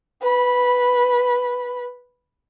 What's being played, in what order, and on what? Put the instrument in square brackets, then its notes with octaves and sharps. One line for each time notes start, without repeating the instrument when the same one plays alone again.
[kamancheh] B4 B5